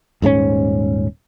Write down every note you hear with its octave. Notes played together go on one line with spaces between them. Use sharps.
D#1 G#2 G#3 C#4